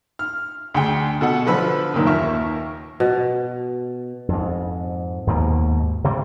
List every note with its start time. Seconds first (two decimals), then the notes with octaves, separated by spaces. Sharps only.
0.19 F6
0.74 D2 G#4 G5
1.21 B2 A4 F#5
1.46 D3 F3 B4 B5 E6
1.94 F#2 A#2 D#3
2.07 D#2 A#4 E5 C#6
3.00 B2
4.28 F2 G#2
5.27 D#2 G#2 B2 A#3
6.04 C3 E3 G3